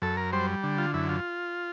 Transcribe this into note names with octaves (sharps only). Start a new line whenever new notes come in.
F#2 A4
A#4
G3 C5
D3
F4
F#2 E4
F4